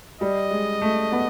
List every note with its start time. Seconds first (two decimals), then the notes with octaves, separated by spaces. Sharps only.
0.21 G3 D#5
0.51 G#3
0.81 A3
1.12 B3